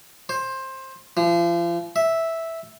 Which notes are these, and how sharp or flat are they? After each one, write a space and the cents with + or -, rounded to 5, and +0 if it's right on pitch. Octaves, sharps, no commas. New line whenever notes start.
C5 +15
F3 -35
E5 -5